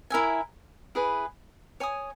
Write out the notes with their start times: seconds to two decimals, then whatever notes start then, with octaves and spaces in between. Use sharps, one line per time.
0.10 E4 A#4 E5 G#5
0.95 E4 G#4 B4
1.80 C#5 G#5 D#6